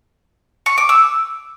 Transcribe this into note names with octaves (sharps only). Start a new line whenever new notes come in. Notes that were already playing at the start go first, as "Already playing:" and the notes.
C#6
D6
E6